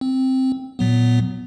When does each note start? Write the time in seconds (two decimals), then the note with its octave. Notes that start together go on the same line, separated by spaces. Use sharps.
0.01 C4
0.79 A#2 F#3 B3